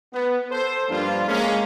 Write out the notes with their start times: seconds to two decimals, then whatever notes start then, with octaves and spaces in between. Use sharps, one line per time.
0.13 B3
0.51 A4 C5
0.89 G2 F3 A#3 D4 F4
1.28 G#3 A#3 C#4